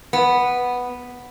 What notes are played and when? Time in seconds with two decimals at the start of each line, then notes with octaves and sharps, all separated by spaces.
0.13 B3